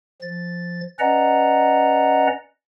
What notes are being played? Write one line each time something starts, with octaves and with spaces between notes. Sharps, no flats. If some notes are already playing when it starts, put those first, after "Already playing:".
F3 A6
C#4 B4 D5 D#5 F#5 A#5